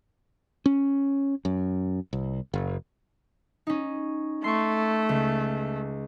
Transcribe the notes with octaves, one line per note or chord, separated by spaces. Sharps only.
C#4
F#2
C2
F#1
C#4 D#4
A3 C6 C#6
C#2